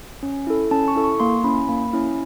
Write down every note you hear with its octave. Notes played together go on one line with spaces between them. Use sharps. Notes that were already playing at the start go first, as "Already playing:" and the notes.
C#4
E4 A4
C#4 A5
C#6
E4 A4
C#6
A#3 C6
C#4 E4 B5
A#3 B5
C#4 E4